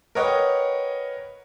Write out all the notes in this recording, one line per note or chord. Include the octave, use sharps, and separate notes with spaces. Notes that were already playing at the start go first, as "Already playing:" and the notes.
A#4 B4 C#5 D#5 F#5 G5